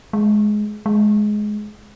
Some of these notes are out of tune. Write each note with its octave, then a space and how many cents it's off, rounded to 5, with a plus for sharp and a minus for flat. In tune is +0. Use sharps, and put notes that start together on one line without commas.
G#3 +15
G#3 +15